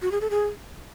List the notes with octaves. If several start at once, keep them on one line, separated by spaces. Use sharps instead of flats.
F#4
G#4
A4
G#4